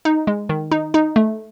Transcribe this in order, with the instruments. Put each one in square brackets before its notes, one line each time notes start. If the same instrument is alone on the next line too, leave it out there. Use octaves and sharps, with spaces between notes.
[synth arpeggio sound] D#4
G#3
D#3
D#4
D#4
A3